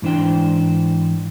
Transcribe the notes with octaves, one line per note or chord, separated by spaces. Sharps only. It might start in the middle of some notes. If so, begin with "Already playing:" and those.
G#2 E3 D4 C5 G5